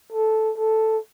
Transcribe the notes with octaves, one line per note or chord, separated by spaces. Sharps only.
A4
A4